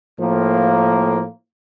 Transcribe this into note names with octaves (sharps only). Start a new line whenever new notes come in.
A2 F3 A#3